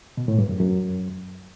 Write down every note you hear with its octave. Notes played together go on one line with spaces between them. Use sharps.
B2
A2
G2
F#2
F#2